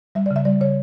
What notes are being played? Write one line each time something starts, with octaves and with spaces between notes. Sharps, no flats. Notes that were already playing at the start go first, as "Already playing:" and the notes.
G3 E5
D5
C#3
E5
G3 D5
C#3 C#5